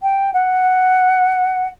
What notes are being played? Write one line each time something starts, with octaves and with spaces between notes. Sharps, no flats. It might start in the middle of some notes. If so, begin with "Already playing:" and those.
G5
F#5